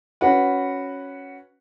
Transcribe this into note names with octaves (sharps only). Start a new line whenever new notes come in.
C#4 F#4 B4 F#5